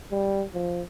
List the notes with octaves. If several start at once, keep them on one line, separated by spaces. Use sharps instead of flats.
G3
F3